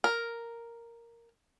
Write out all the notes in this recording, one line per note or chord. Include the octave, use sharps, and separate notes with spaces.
A#4